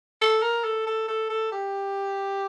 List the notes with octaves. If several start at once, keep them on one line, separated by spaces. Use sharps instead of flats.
A4
A#4
A4
A4
A4
A4
G4